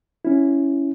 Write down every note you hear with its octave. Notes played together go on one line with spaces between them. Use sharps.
C#4 E4